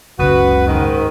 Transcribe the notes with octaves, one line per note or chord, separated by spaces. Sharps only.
F#1 C#2 C#3 F#4 B4
G#2 D#3